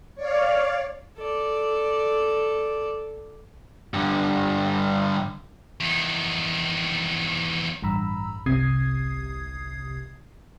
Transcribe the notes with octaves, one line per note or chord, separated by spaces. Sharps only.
C#5 D5 F5
A4 D5
G2 D3
E2 D#3
A1 G2 A#5 B5 E6
G1 C2 C3 D#6 G#6 C7